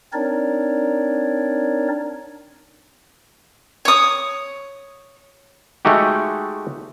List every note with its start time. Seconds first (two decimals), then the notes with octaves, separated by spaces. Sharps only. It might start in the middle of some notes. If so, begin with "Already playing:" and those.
0.13 C4 D4 D#4 A#4 C#5 D5
3.85 C#5 D#6
5.85 G#3 A3 D#4 F#4 G4